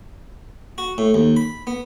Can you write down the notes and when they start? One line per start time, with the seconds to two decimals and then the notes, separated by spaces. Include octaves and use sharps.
0.78 F#4
0.98 A2
1.14 D#2
1.36 B5
1.67 B3